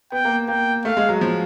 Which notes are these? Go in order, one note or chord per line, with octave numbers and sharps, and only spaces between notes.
B3 G5
A#3
A#3 G5
A3 F5
G#3
F#3
F3